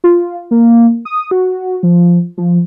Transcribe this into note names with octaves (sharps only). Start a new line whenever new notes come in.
F4
A#3
D#6
F#4
F3
F3